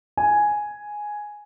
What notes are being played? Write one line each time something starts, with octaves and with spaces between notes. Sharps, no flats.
G#5